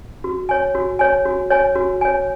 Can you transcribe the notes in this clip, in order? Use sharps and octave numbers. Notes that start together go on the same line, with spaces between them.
F#4
C#5 G#5
F#4
C#5 G#5
F#4
C#5 G#5
F#4
C#5 G#5